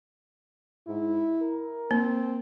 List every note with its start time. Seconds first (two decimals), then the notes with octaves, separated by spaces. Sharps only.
0.88 G#2 E4
1.41 A#4
1.91 A#3 C4